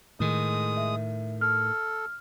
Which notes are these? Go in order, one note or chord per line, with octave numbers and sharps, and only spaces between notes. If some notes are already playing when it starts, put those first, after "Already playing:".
A2 D#3 G#3 D#6
E5
A4 F6